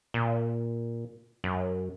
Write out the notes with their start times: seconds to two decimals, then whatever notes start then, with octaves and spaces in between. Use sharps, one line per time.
0.14 A#2
1.44 F#2